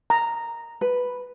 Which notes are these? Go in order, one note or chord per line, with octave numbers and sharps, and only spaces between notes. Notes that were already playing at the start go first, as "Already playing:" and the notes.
A#5
B4